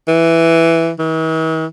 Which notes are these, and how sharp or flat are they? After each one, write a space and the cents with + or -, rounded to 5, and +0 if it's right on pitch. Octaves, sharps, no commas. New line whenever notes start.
E3 +5
E3 -45